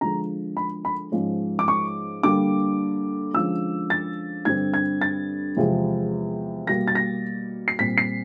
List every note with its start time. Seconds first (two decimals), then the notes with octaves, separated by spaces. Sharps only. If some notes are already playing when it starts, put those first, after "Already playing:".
0.01 D3 F3 G#3 A#5
0.57 B5
0.85 B5
1.12 G#2 F3 G#3 C#4
1.59 D6
1.68 C#6
2.23 D3 G3 A#3 D6
3.34 D3 F3 G#3 C#4 E6
3.90 A6
4.45 G2 D3 G3 C4 G#6
4.74 G#6
5.01 A6
5.57 E2 C3 F3 G#3
6.67 B2 G3 A#3 A#6
6.88 A6
6.95 A#6
7.68 C7
7.79 A#2 G3 C4 B6
7.98 C7